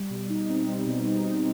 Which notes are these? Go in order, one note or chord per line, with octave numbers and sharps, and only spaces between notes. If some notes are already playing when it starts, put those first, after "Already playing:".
Already playing: G3
B2
D#4
C4
G3
B2
D#4
C4